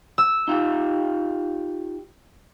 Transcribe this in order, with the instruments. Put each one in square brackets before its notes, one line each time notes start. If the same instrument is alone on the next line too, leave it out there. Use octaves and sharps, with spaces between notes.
[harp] E6
[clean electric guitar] D#4 F4 G4